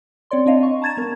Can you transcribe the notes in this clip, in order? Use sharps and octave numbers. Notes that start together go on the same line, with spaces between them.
C4 C#5 D5 C6
C4 D4 D#5 F5
C#6
A5 A#5 G#6 A6 E7
B3 A#4